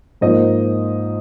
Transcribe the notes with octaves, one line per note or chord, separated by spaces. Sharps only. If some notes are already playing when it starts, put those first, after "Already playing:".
G#2 F3 A#3 C5 D#5